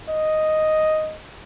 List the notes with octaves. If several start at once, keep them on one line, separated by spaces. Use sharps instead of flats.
D#5